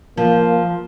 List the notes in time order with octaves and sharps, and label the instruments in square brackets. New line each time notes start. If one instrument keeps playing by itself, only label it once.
[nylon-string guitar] F3 [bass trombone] A#3